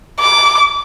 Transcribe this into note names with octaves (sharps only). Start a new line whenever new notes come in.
D6